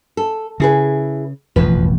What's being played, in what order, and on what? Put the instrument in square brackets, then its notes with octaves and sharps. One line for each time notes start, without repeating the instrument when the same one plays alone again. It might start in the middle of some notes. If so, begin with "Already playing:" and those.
[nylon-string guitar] A4
[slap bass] C#3 [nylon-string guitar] E4 G#4 B4
[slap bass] E1 A1 F2 [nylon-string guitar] F3 B4